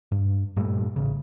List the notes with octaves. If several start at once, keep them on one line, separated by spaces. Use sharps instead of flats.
G2
G2 A#2 G3 A3
A1 C#3